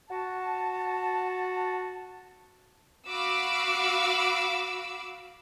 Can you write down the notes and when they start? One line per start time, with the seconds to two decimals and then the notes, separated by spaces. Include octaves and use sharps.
0.10 F#4 A5
3.08 F#4 F5 B5 D6 E6